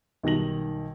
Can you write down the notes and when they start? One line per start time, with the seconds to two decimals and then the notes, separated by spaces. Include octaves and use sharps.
0.23 B1 D#3 G3 A#6 F#7